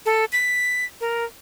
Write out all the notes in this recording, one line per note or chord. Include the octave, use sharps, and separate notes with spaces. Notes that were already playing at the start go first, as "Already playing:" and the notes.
A4
B6
A#4